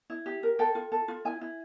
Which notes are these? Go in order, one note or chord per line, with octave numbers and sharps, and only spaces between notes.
E4
G4
A#4
A4 G5
F4
A4
F4
E4 G#5
E4